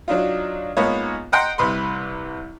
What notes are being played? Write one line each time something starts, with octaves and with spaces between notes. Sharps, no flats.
F#3 D4 D#4 F4
G#2 A#3 B3 D#4 F4 C#5
D#5 F#5 G5 A#5 C6
C2 C3 B4 B5 C6